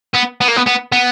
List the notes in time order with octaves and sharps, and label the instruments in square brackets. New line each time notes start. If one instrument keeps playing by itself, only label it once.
[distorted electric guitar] B3
B3
A#3
B3
B3
B3